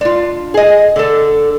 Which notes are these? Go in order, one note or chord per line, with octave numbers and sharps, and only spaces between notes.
D4 F4
G#4 D#5
D3 A4